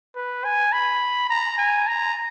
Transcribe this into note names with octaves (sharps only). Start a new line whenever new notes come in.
B4
G#5
B5
A#5
G#5
A#5